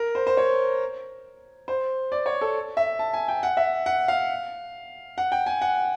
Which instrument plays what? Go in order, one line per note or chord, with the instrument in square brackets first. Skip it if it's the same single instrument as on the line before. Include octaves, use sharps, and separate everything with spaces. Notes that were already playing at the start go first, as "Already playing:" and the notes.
Already playing: [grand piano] A#4
C5
C5
C#5
C5
D5
C#5
A4
E5
A5
G#5
G5
F#5
E5
F#5
F5
F#5
G5
G#5
F#5